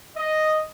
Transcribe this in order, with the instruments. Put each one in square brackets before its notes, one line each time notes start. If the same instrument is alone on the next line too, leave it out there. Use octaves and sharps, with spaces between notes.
[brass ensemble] D#5